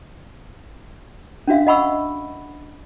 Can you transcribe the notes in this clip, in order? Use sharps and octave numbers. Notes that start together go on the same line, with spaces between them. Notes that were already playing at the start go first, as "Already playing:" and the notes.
C#4 D4 F#4 E5 F5
D#5 F#5 B5 C#6 E6